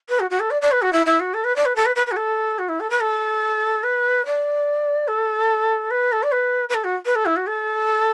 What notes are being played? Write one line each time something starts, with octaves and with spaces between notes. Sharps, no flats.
B4
F#4
F#4
A4
D5
D5
B4
F#4
E4
E4
F#4
A4
B4
D5
B4
A4
B4
B4
B4
F#4
A4
F#4
E4
A4
B4
A4
B4
D5
A4
B4
A4
D5
B4
B4
A4
F#4
B4
A4
E4
F#4
A4